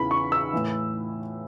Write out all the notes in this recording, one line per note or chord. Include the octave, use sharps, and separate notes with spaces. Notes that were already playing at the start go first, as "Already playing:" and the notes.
Already playing: E2 C#3 E3 B5
C#6
E6
A2 E3